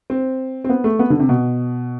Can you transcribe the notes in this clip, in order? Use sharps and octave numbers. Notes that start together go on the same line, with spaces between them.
C4
C4
B3
A3
B3
D3
C3
B2